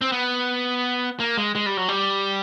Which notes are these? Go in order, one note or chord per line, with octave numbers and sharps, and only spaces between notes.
C4
B3
A#3
G#3
G#3
G3
F#3
G3